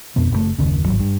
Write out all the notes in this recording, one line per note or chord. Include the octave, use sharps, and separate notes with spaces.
F2 B2 B3
F#1 B2 A3
F#1 D#2 C#3
G#1 D#2 F#3
G2